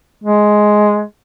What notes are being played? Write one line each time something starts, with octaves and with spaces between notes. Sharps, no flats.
G#3